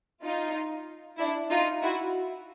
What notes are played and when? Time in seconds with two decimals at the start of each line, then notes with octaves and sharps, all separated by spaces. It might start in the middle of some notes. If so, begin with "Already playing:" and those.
0.24 D#4 F4
1.18 D4 E4
1.50 D#4 F4
1.82 E4 F#4